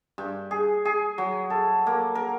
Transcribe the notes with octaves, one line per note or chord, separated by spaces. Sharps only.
G2
G#4
G#4
F#3
A4
A#3
A#4